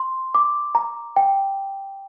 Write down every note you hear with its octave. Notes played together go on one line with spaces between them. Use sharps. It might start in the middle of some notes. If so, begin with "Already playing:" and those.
Already playing: C6
D6
A#5
G5